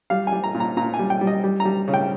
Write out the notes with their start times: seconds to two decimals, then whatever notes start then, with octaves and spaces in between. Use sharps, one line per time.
0.10 G3 F5
0.27 G#5
0.32 G3
0.44 A#5
0.54 A#2
0.60 A#5
0.77 A#2 A#5
0.94 G#5
0.99 G3
1.10 G5
1.21 G3
1.27 D#5
1.44 G3
1.60 A#5
1.65 G3
1.88 C#3
1.94 G5